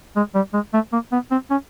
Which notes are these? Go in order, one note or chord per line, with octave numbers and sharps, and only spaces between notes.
G#3
G3
G#3
A3
A#3
B3
C4
C#4